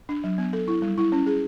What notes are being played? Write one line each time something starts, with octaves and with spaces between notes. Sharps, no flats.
D4
F#3
B3
A4
E4
G3
E4
C#4
G#4